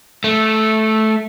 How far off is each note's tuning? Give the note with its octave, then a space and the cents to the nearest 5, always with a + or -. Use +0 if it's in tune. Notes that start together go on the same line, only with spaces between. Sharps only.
A3 -10